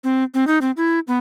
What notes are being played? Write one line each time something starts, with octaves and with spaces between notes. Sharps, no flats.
C4
C4
D#4
C4
E4
B3